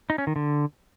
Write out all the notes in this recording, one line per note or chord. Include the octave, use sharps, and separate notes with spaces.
D#4
C#4
D#3
D3